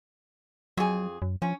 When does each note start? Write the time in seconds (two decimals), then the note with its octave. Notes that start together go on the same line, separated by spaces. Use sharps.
0.77 F2 F#3 G#4
1.22 F#2
1.42 F3 C#4